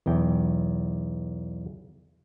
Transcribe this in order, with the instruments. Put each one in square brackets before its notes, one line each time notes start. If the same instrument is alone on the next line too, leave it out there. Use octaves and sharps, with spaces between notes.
[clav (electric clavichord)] B1 E2 G5